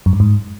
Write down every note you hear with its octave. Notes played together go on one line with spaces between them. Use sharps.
F#2
G2
G#2